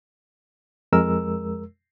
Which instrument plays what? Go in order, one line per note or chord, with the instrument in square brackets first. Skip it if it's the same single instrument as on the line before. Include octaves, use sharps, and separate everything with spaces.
[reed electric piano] F2 G#3 A#4 E6